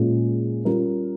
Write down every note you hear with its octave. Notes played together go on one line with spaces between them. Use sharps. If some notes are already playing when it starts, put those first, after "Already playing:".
Already playing: A#2 G#3 C#4 F4 G#4
G3 C#4 F4 A#4